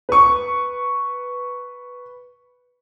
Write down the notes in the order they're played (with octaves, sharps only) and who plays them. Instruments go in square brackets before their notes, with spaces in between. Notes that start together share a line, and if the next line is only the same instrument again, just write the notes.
[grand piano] B4 C#6